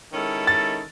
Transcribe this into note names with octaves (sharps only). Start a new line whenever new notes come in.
D#3 G#3 C#4 E4 A4
A6